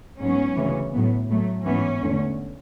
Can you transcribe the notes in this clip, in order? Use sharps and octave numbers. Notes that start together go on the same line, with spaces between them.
G#2 F#3 B3 C#4
D2 C#3 E3
A2 F#3 B3
A2 F#3 A3
G#2 E3 B3 C#4
E2 D3 A3